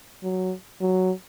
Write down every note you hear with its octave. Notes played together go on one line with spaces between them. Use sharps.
F#3
F#3